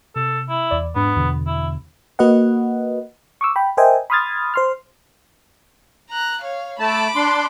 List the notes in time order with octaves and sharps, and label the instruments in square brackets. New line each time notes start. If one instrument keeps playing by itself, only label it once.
[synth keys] C3 [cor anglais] A4
[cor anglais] E4
[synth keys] E2 D5
[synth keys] G#2 D4 [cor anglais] B3
[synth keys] E2 B2 D3
[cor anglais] E4
[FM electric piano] A#3 F#4 B4 D#5 F#5
C#6 D6 E6
G5 B5
A#4 C5 D#5 E5 G5 G#5
B5 C6 D#6 F6 G#6 A6
C5 C6 F6
[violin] A#5 F#6
C#5 F5
[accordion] A3 A5 [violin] B5 D6
[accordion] D4 C6